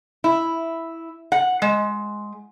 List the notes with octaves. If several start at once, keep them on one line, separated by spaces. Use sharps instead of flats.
E4
F#5
G#3